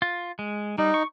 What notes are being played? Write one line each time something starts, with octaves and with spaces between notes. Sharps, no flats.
F4
G#3
G3 D#4
C#6